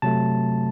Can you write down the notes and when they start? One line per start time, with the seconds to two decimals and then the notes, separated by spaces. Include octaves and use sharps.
0.02 C3 F#3 A3 A5